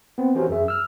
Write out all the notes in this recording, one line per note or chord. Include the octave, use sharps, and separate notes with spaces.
B3 C4
E3 C#4 F#4 G4 A#4 C5
F#2 G#4 E5
E6 F6